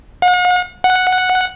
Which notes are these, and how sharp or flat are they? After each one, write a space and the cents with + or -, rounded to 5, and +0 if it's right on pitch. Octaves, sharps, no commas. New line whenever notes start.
F#5 -45
F#5 -5